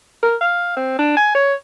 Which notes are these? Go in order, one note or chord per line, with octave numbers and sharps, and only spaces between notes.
A#4
F5
C4
D4
G#5
C#5